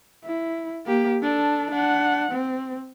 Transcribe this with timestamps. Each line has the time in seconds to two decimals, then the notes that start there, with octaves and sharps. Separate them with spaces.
0.24 E4
0.86 A#3 G4
1.22 D4 A4
1.71 D4 F#5
2.31 C4